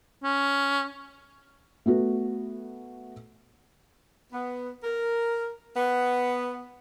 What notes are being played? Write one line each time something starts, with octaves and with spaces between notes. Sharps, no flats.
C#4
A3 B3 F#4
B3
A#4
B3